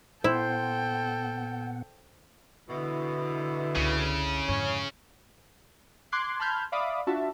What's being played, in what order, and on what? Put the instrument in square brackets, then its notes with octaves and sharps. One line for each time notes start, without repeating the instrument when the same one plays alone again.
[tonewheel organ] A#2 B3 F#5 [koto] E4 [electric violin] A4 G5 [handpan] C5
[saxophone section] B2 E3 [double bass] D3 E4
[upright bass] F#1 C#2 [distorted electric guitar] C#3
[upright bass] F2 G#2 [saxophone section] C#4
[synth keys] C6 D6 F#6 G#6 C7
A5 B5 C6 F6 G6 G#6
D5 E5 F5 B5 D6 D#6
D4 F4 F#4 E5 A5